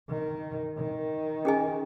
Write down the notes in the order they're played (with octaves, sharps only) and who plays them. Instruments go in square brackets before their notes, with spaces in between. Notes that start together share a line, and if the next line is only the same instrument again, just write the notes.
[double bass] D#3
D#3
[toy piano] C#4 G#4 D#5 G#5